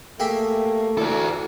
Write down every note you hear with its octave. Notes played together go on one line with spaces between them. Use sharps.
A3 A#3 G4 G#4 E5
E4 F#4 A4 D5